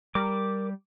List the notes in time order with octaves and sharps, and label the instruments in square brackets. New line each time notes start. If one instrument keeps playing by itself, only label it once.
[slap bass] G3 [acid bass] A#4 [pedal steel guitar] D6